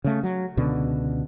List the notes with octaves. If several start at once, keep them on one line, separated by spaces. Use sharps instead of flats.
C#3 A3
F#3
C#2 B2 D3